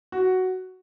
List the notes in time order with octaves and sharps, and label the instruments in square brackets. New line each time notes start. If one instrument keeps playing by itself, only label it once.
[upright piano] F#4